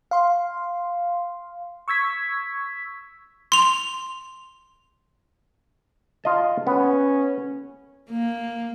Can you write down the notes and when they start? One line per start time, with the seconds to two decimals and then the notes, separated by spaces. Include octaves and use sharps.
0.11 F5 C6
1.88 C#6 E6 G#6 B6
3.52 C6 F7
6.24 F4 D#5 A5
6.67 B3 C#4
8.10 A#3